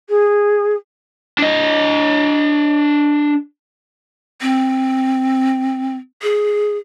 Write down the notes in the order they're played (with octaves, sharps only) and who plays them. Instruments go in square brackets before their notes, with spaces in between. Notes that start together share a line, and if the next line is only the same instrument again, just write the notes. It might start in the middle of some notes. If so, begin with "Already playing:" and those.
[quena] G#4
[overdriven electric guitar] D4 D#5
[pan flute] C4
G#4